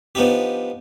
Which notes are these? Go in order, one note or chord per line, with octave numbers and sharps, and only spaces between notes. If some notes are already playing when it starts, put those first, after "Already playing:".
F3 B3 D4 D#4 G4